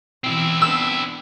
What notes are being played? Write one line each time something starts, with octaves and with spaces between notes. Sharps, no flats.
B2 E3 C4 E4
B3 D4 E6